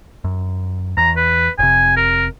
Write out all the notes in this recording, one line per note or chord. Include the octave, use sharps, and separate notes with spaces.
F#2
E2 A#5
B4
F1 C3 G#5
A#4